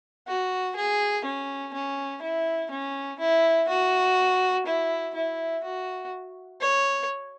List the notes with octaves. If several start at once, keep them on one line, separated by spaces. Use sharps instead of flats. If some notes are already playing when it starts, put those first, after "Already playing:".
F#4
G#4
C#4
C#4
E4
C#4
E4
F#4
E4
E4
F#4
C#5